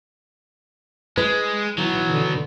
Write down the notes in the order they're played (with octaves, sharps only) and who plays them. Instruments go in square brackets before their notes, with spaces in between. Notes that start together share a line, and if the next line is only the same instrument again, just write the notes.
[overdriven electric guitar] G#3 [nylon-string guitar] B4
[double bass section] E3 [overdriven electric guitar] F#3 B3
[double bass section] D3